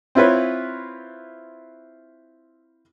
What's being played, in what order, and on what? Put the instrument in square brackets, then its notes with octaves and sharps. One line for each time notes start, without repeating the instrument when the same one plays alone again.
[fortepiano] C4 E4 F4 B4 C#5